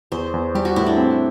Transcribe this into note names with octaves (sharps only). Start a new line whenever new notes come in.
E2 C5
E2
G3 G4
F#4
A2 E4
D4
C4